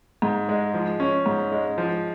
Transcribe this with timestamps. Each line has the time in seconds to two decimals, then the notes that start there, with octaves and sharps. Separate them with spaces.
0.22 G#2
0.49 G#3
0.74 F3
1.00 C#4
1.26 G#2
1.52 G#3
1.78 F3